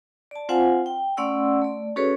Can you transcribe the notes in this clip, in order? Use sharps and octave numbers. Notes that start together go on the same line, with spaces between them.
D5 A5
C4 F4 C5 F5 F#5 G#5
G5
A3 C#4 D5 F#5 C6 E6
A3 D5
C#4 F#4 G#4 A4 B4 C#5